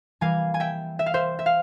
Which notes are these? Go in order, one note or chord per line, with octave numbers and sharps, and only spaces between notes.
E3 G3 A#3 F5 G#5
G#5
E5 G5
E5
F5
C5 E5
E5
F5